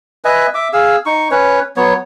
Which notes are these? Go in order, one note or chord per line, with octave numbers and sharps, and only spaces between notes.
B4 D#5 E5 G#5
E5 D6
G#4 F5 E6
D#4 C#6
C#4 B4 C#5
F#3 B3 C#5